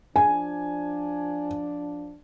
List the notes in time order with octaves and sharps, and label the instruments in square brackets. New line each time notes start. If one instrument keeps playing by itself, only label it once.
[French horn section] F3 D4 [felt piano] G#5